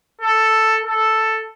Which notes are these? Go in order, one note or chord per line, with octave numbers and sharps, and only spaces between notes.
A4
A4